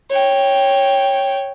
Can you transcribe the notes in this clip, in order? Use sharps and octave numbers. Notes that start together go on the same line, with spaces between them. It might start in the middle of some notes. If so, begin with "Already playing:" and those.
C#5 G5